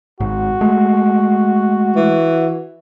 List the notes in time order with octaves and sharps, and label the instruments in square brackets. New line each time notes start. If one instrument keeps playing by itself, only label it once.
[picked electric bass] G#1 G#2 [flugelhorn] F#4
[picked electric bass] G#3 A3
[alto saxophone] E3